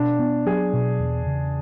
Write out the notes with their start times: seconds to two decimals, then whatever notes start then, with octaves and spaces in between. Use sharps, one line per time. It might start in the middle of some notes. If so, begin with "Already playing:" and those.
Already playing: B2 D4
0.19 B3
0.46 F#3 G#4
0.73 B2
1.00 E2
1.26 C#3